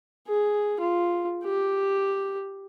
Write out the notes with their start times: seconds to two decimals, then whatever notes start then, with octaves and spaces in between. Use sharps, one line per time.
0.28 G#4
0.80 F4
1.44 G4